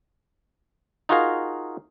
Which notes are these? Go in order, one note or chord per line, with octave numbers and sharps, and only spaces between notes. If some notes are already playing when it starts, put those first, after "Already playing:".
D#4 F4 F#4 G#4 A#4 F5